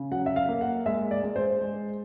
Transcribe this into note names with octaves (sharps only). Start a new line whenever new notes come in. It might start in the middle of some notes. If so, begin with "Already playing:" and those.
Already playing: C#3
F#3 F#5
E5
F5
A#3
F#5
G#3 E5
D5
G#3
C5
G#3